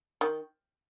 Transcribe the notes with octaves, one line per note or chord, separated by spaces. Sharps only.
D#3